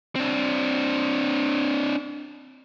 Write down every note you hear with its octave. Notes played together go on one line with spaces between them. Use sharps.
C4 D4